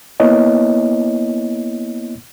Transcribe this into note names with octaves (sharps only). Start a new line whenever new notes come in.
A#3 B3 E4 C#5 D#5